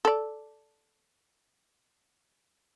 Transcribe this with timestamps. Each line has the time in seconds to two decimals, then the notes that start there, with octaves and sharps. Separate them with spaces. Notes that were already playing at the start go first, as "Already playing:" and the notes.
0.05 A4 D5